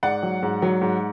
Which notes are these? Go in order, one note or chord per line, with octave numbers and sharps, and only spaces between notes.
G#2 D5 F#5
F#3
G#2
F#3
G#2